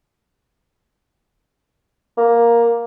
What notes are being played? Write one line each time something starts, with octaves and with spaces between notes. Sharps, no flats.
A#3